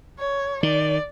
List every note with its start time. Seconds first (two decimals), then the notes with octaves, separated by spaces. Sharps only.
0.19 C#5
0.63 D#3 D5